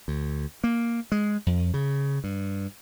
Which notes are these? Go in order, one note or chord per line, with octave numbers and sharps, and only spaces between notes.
D2
A#3
G#3
F2
C#3
G2